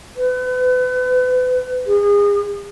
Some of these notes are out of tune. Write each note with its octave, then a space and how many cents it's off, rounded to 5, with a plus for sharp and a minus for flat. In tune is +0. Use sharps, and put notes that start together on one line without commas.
B4 +35
G#4 -30